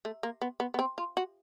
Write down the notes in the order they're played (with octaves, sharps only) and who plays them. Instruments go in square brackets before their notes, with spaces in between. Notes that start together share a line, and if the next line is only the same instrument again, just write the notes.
[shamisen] A3
A#3
B3
B3
B3
C4
F4
F#4